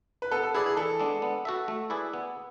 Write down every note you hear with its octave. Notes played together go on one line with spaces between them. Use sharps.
B4
B3 A4
A4
E4 G#4 B4 D5
G#4
E3 A4
G#3 B3 D4
B3
F#4 A4 E5
A3
E4 G#4 B4 D5
B3